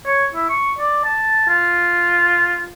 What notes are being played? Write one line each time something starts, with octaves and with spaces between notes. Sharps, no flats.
C#5
E4
C#6
D5
A5
F4